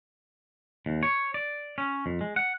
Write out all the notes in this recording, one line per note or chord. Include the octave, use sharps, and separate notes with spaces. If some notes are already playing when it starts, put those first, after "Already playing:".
D#2
C#5
D5
C#4
F2
G#3
F#5